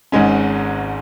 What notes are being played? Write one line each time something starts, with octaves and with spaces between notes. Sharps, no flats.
G#1 G#2 G#3 C#4